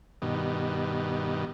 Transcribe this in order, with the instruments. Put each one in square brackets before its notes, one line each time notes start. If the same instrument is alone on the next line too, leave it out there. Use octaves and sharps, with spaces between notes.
[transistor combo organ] G2 B2 D#3